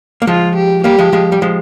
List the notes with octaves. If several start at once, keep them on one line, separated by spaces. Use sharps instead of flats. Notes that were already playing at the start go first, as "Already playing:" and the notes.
A#3
F3 G#3 F4
G4
G3 A#3 G4
F3 G#3
F3 G#3
G3
F3 G#3